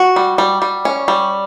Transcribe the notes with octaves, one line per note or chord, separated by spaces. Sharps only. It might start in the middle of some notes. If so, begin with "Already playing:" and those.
Already playing: F#4
G3
G3
G3
C#4
G3